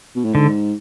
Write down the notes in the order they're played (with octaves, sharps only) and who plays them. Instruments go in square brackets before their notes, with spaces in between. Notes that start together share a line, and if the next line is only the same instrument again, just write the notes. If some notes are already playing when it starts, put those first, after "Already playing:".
[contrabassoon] B2
A2
[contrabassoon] G#2 [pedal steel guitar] D3